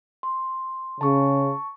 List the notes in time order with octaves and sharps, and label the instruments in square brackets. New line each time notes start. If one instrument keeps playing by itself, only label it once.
[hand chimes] C6
[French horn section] C#3 [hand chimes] A5 C#6